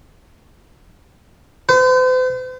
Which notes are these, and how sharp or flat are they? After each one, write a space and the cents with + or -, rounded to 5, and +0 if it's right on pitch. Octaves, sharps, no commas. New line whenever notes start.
C5 -45